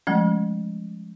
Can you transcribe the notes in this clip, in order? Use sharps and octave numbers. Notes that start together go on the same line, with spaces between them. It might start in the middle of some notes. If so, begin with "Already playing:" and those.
F3 G#3 A3 C#4